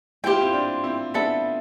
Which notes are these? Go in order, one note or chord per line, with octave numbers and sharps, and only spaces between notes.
E4 G4 C5 G5
F4
C4 E4
D4 F4
C4 E4
B3 D4 A4 E5 B5